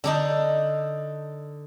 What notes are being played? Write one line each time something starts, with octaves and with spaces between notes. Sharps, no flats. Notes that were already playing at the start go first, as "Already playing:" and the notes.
D3 D4 D#4